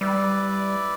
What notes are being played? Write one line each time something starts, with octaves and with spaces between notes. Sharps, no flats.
G3 E4 B4 D5